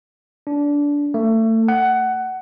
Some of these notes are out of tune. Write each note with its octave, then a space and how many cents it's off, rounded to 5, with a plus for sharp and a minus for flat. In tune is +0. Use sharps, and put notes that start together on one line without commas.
D4 -20
A3 +30
F#5 +15